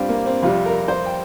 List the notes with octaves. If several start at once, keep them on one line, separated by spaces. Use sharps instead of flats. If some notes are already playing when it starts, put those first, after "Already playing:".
Already playing: G2 G3 C4 F4 G4
A#3
C4
F2 C3 G3 F4
A#4
C5
G5